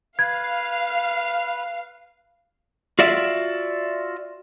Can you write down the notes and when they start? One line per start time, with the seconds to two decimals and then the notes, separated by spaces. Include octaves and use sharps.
0.19 B4 F5 G#6
2.99 F4 F#4 D5 E5